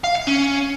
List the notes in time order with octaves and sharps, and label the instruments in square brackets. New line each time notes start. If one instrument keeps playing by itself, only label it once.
[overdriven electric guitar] F5
F5
C#4